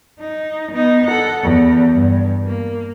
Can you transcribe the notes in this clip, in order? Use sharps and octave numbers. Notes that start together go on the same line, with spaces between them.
D#4
B3 D#4
A4 F#5
E2
G2
A#3